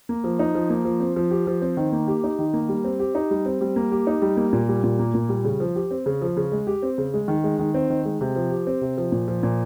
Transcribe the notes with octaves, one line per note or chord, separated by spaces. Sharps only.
A#3
F3
D#4
F3
A#3
F3
C4
F3
G4
F3
C4
D#3
A#3
G4
D#4
D#3
A#3
G3
C4
G4
D#4
G3
C4
G3
A#3
G4
D#4
G3
A#3
A#2
G3
A#2
A#3
A#2
G3
C#3
F3
G4
C4
C#3
F3
C#3
G#3
G4
C4
C#3
G#3
D#3
G#3
D#3
C4
D#3
G#3
C3
F3
G4
C4
C3
F3
A#2
F3
A#2